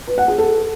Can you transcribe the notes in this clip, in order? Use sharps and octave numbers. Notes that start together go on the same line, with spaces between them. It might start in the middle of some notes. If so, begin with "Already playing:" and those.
B4
F#5
G#4
A4